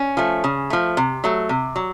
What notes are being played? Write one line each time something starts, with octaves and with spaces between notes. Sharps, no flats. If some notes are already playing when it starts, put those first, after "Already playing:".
Already playing: C#4
F3 A3
C#3
F3 A3
C3
F#3 A3
C3
F#3